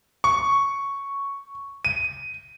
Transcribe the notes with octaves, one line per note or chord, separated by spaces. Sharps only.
C#6
D#7